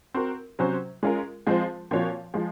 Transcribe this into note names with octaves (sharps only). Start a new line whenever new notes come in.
C4 F#4 A#4
C3 F#3 C#4 F#4 C5
G#3 C#4 F4 A#4
F3 G#3 C4 F4 C5
A#2 F3 C4 F#4 C#5
F3 G#3